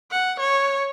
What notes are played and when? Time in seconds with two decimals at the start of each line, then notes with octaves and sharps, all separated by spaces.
0.11 F#5
0.40 C#5